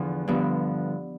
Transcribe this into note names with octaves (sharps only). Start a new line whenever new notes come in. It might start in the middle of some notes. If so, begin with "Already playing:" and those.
Already playing: E2 D3 F3
G2 D3 F3 B3